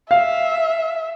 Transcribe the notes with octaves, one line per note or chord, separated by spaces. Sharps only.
E5 F5